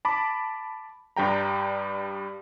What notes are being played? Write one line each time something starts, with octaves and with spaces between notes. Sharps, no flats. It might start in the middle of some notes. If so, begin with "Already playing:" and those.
A5 B5 D6
G2 G3 G5 A#5